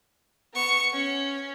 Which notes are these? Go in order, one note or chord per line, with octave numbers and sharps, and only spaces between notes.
B3 C#6
C#4